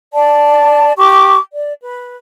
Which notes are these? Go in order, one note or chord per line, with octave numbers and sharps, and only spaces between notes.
D5 A5
G4 C#6 D6
D5
B4